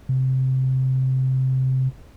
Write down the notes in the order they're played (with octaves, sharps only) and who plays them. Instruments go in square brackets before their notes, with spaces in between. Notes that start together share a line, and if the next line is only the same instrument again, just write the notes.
[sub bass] C3